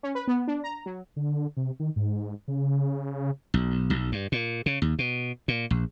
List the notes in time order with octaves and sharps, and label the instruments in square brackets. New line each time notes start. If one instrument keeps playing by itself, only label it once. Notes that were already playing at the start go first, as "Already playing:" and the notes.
[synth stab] C#4
B4
B3
D4
A#5
F#3
[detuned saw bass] D3
C3
D#3
G#2
C#3
[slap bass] B1
B1
G2
A#2
C#3
D#2
B2
A#2
A#1